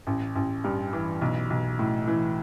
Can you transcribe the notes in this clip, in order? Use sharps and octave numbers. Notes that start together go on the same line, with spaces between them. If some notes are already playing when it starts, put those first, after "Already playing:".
A1
A1
G2
E3
B1
B1
A2
E3